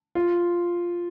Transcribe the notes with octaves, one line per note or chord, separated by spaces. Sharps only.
F4